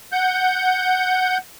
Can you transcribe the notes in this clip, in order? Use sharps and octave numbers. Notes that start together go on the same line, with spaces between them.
F#5 G6